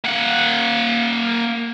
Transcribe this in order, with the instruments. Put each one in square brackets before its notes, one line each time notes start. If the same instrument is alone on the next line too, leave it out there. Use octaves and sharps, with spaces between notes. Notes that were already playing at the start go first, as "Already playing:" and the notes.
[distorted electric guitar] A#3 F#5